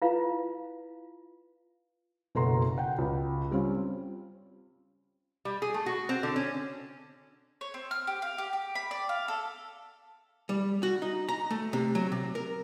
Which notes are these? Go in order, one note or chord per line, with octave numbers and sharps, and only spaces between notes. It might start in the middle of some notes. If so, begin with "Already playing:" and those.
E4 F4 B4 F5
F#1 B2 A4 F#5 A#5 C6
F#5 G5
C#2
G3 C4 C#4 F4
G3
G#4
A3
F#4
C4
D3
C#4
C#5
C4
F6
G4
F5
G4
G4
B5
D5
F5
A4
G3
F#4
D#4
A#5
A3
C3
F#3
C3
A#4